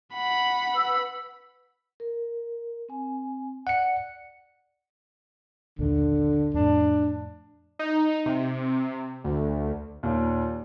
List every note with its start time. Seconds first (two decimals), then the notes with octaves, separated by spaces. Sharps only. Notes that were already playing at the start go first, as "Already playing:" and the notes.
0.14 F#5 B5
0.74 B4 E6
2.00 A#4
2.89 C4 G#5
3.67 D5 F#5 C#7
5.79 A#1 D#2 D3
6.54 F2 A2 D4
7.79 D#4
8.26 C3
9.24 D2
10.03 D#2 A#2